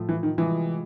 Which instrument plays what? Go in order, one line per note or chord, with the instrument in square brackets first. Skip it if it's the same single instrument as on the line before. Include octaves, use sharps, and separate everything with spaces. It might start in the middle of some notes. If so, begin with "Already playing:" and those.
Already playing: [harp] A2 F3 A3
[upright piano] E3
D#3
[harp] C3 F3 G#3 [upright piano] E3